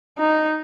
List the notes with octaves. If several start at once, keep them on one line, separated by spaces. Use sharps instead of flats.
D#4